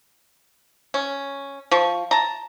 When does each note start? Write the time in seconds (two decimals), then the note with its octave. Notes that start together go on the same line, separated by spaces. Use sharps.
0.94 C#4
1.71 F3 C#6
2.11 A5 A#5